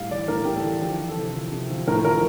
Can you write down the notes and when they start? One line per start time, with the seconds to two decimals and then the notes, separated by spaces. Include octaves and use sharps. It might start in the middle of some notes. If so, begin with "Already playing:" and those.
Already playing: A2 G3 F5
0.11 E3 D5
0.28 A2 A#4
0.45 A2 G4
0.56 A4
0.64 E3
0.81 F3 G4
0.99 F3
1.08 A4
1.16 C3
1.35 F3
1.52 C3
1.70 F3
1.88 A2 A#4
2.05 F3 A#4